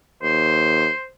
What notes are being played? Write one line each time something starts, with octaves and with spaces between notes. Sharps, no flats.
D#2 C5